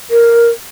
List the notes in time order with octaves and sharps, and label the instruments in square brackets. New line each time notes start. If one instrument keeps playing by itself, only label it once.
[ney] A#4